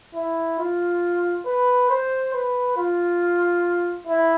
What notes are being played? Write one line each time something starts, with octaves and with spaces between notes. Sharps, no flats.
E4
F4
B4
C5
B4
F4
E4